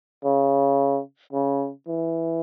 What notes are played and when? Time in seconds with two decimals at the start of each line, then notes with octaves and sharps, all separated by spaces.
0.25 C#3
1.33 C#3
1.87 E3